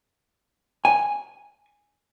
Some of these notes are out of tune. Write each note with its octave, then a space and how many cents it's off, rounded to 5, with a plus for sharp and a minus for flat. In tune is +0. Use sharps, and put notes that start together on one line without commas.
G#5 -5